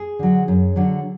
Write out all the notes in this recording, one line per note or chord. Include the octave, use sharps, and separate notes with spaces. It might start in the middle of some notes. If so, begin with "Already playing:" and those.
Already playing: G#4
D3 F#3
F#2
D3 F#3